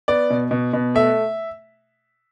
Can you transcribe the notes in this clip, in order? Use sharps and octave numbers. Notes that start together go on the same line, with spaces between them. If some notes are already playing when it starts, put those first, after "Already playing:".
B3 D5
B2
B2
B2
A3 E5